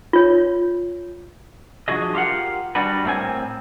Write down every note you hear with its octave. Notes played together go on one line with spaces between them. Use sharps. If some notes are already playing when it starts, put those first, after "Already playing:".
F4 C#5
F3 D4 F#4 G#4 D#5
F4 G4 A#4 F5 F#5
G3 D4 F#4 B4
A2 A#3 C4 A#4 G#5